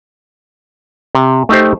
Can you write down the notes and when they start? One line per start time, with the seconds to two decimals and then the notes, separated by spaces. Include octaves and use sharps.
1.15 C3
1.49 A3 D#4 G4 C5